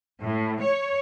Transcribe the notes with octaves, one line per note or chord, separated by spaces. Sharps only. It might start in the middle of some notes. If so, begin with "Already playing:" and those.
A2
C#5